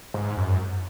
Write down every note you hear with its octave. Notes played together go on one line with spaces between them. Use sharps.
G#2
F#2